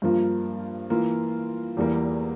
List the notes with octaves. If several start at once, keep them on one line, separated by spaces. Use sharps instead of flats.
G2 F3 A#3 F4
E3 A#3 F4
E2 E3 G3 A#3